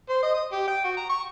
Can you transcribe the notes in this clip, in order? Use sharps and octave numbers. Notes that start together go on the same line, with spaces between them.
C5
D#5
D#6
G4
G5
F#4
A#5
C#6